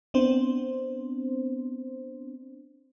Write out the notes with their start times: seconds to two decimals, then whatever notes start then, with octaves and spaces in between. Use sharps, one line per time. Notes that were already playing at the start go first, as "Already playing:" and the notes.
0.14 B3 C4 D4 C5